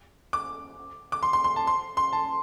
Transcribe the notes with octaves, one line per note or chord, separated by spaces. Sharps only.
D6
D6
C6
C6
C6
A5
C6
C6
A5